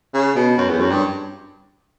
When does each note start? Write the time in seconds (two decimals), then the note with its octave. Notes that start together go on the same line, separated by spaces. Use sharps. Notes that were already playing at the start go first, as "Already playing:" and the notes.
0.14 C#3
0.35 B2
0.58 F#2
0.70 E2
0.80 F#2
0.91 G2